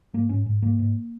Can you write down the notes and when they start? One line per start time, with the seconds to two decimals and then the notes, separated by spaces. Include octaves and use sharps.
0.14 G#2 A#3
0.29 G#2 C#4
0.46 G#2
0.62 G#2 A#3
0.79 G#2